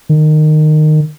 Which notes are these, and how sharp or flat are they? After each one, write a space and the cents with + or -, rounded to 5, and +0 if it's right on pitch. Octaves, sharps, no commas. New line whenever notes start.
D#3 -20